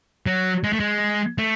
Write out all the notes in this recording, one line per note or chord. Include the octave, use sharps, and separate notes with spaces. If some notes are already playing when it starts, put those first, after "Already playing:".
F#3
G#3
A3
G#3
A3